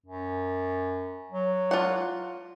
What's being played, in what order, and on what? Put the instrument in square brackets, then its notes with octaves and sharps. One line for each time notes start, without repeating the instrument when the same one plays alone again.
[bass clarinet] F#2
F#3
[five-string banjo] F4 F#5